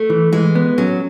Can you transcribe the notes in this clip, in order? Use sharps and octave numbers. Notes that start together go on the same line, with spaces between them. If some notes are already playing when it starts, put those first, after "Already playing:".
Already playing: A3
E3
E3 G#3
B3
F#3 C#4